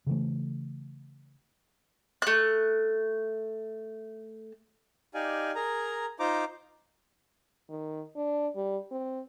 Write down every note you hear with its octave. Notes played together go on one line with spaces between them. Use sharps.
C#3 E3 A3
A3 F#6
D#4 G4 D5 F5 G#5
G#4 A#4 A#5
D#4 F4 C5 A#5 D6
D#3
D4
G3
C4